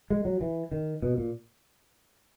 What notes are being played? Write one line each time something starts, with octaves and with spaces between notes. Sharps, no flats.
G#3
F#3
E3
D#3
B2
A#2